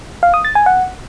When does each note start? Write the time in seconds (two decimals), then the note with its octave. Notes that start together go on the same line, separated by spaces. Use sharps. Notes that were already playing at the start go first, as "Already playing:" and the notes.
0.23 F5
0.34 D#6
0.45 A6
0.55 G#5
0.66 F#5